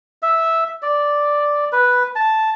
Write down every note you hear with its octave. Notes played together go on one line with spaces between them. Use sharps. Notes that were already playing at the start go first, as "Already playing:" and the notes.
E5
D5
B4
A5